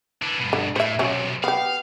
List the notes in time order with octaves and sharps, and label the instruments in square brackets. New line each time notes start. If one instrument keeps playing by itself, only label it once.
[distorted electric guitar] E3 D4
G2 B2
[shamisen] D3
[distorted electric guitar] A2 [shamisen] C5 E5
[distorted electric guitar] B1 C3 [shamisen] F#3 C#4
[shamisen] B3 G4 [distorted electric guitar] F5